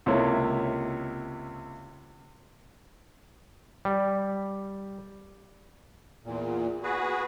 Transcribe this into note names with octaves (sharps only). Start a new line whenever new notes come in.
C#2 C3 A#3 E4 A4 C#5
G3
E2 A#2
F#4 G#4 B4